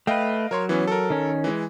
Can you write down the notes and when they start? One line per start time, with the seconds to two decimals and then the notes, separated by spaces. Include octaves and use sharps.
0.07 A3 B4 D#5 F5 G5
0.51 F#3 A#4 C#5 C6
0.69 E3 B3 C#4
0.87 A4 A#4
1.10 D#3 C#4
1.44 E3 G#3